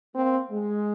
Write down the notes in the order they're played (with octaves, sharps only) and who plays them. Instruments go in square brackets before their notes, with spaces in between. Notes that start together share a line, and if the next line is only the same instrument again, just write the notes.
[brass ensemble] A#3 [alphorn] C4
[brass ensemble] G#3